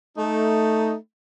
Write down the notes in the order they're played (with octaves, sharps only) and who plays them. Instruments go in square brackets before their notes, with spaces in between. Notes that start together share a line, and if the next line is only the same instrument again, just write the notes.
[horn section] A3 D#4